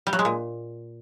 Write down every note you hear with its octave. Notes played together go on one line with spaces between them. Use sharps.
G3
F#3
G#3
A#2